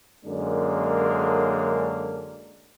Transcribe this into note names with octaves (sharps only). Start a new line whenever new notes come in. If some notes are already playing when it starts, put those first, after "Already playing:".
F#2 D3 G#3 A#3 C#4 D4